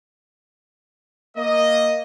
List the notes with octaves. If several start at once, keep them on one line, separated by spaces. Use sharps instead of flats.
A#3 D#5